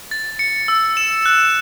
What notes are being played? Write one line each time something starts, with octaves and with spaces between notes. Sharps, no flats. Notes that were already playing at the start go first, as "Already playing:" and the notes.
A6
C#7
E6
E7
F#6